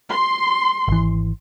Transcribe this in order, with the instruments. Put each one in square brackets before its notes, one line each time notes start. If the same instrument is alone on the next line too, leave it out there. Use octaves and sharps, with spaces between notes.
[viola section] C6
[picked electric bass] G#1 E3